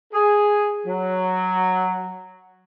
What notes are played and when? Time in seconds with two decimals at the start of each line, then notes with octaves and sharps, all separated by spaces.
0.13 G#4
0.87 F#3